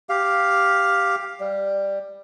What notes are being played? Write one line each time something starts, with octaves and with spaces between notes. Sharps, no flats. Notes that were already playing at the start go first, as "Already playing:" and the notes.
G4 F5
G3